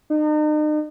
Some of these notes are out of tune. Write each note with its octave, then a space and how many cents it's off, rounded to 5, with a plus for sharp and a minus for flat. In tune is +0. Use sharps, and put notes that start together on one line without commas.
D#4 -40